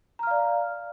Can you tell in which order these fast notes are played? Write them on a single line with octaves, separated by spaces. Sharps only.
A#5 F6 F5 D5